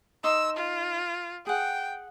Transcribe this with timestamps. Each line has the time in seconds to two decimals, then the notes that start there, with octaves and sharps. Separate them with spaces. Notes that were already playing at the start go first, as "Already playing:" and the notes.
0.24 D#4 C6 D#6 E6
0.57 F4
1.47 G#4 F#5 G5